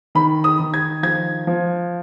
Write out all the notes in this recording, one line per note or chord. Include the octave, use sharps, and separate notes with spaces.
D#3 B5
D#6
D#3
G#6
F3 G#6
F3